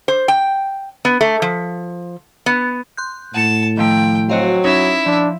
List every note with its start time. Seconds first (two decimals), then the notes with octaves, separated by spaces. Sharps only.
0.08 C5
0.28 G5
1.05 B3
1.21 A3
1.42 F3
2.46 B3
2.97 C6 F#6 G6
3.34 A2 F#5 A5 C#7
3.77 D#3 F3 A3 G5
4.29 F#3 C4 F#4 D#5 F5
4.64 C#4 D#4 E4 C#5 E5
5.06 F3 D4